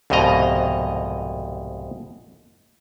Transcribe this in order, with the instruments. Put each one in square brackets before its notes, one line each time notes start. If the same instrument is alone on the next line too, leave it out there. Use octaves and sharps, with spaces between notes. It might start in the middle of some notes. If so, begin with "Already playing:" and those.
[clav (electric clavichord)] C2 F2 G#2 B2 D#5 A#5